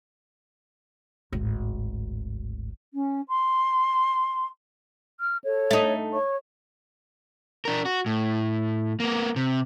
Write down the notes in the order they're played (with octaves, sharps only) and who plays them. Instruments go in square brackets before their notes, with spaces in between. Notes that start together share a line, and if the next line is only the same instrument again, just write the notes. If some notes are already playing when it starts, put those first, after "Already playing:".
[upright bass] D1 G#1
[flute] C#4
C6
[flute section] F6
A4 C#5
[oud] A3 D#4
[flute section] C#5 C#6
[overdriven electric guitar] D4 A#4
F#4
A2
A#3 B3
C3